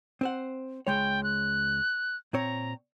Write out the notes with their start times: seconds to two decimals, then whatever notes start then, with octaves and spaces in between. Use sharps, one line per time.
0.21 C4 C5 F#5
0.87 C#2 G#3 C#5 G5
1.24 F#6
2.33 A#2 C4 C#5 A#5